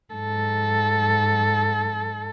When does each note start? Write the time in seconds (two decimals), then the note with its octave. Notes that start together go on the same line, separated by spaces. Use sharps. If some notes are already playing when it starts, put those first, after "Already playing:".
0.14 G#2 A4